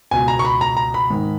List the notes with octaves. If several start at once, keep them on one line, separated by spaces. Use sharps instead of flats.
C#2 B2 G#5
A#5
C#6
B5
A#5
A#5
B5
G#2 D#3